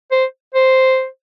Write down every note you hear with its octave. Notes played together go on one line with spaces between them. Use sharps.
C5
C5